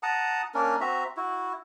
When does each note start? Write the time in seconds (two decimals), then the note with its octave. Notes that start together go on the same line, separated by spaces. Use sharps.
0.03 F#5 A5 A#5 D#6
0.54 A#3 C#4 D4 A#4
0.81 C4 F#4 E5 A#5
1.17 E4 F#4